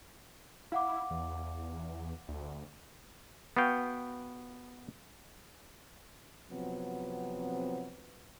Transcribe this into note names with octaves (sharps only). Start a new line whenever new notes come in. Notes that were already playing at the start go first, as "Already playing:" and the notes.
E4 F5 F#5 D6
E2
D2
B3 F#4 F5 G5
C3 F3 F#3 B3 C4